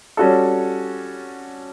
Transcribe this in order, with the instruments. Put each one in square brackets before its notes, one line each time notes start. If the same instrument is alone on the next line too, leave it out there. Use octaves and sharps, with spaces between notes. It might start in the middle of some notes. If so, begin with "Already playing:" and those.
[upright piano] G3 C#4 F#4 A4